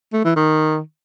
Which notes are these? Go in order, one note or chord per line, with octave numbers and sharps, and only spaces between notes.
A3
E3
D#3